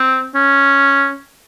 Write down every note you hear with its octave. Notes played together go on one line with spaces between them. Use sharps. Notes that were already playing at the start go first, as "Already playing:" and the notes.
Already playing: C4
C#4